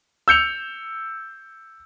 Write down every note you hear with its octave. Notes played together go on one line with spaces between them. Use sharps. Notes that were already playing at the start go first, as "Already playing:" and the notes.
E6 G6 C#7 F7